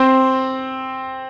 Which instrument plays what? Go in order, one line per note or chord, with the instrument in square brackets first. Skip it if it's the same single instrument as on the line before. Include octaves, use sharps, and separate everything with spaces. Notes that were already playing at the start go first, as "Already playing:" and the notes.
Already playing: [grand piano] C4 C5